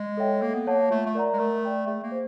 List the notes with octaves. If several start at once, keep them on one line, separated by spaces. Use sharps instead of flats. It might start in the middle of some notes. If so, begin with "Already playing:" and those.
Already playing: G#3
A4 C#5 E5 G5
A#3 A4
B3
A#3 C#5 F#5 A5
A3 F4
A3
A#4 D5 F#5 A#5
G#3
A3 A#4
D5 G5 B5
A3 G#4
A#3
C5